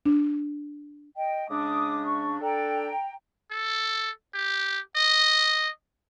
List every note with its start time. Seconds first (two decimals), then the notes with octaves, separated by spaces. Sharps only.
0.06 D4
1.15 D#5 G5
1.49 C#3 G#3 D4 D6 D#6
2.05 C#6
2.41 D4 A4 G5 A#5
3.51 A4
4.34 G4
4.96 D#5